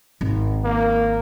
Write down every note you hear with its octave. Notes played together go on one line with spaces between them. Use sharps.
G#1
A#3